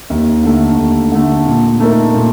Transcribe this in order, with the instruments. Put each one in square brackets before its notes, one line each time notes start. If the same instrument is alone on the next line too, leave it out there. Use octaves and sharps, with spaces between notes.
[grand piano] D#2
D3 A3
D#2
D3 A3
A#2
A3 D#4 A#4
A#2